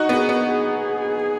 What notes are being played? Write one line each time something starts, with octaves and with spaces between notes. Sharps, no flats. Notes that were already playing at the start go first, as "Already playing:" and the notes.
Already playing: D#4 F#4
B3 G#4
B3
G#4